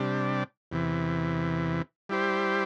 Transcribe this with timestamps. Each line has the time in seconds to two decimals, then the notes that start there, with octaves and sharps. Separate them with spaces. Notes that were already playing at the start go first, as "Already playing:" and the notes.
Already playing: C3 G3 D4
0.72 E2 C3 E3
2.09 G3 E4 G4 C5